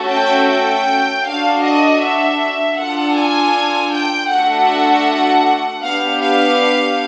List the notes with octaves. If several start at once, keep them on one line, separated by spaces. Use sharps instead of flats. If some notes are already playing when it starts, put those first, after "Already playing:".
Already playing: A3 C#4 F#4 A4
G5
G5
D4 F#4 A4 F5
D#5
E5
D4 F4 A4 F#5
G#5
G5
A3 D4 F#4 A4 F#5
B3 D4 G4 F5
F5